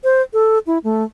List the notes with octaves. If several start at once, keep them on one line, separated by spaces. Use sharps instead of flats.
C5
A4
E4
A3